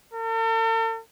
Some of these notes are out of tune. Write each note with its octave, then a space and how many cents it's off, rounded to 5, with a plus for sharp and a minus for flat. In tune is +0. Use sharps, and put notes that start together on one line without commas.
A4 +45